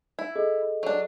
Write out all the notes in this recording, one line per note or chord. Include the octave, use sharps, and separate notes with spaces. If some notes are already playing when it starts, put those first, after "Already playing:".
E4
G#4 A4 D#5
F#3 D4